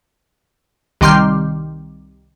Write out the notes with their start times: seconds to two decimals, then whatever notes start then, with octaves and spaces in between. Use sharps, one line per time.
1.01 C2 D#3 G3 C6 F6 G6